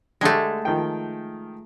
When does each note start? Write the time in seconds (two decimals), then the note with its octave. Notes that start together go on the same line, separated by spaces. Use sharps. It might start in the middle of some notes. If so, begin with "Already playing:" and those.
0.21 D3 G#3 A3 D4 G4
0.65 D#3 F3 G5